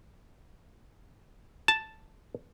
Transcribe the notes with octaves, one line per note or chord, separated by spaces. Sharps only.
A5